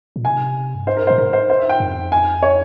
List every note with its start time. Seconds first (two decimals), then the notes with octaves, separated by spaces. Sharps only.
0.16 A#2
0.25 C3 G#5
0.75 G2
0.86 G#2 C5
0.97 A#4
1.07 A#2 C5
1.18 G#2 A#4
1.33 C5
1.50 C5
1.59 E5
1.69 G5
1.80 F2
2.12 G#5
2.43 C#5